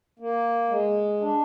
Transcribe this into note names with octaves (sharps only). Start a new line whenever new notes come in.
A#3
G#3
D4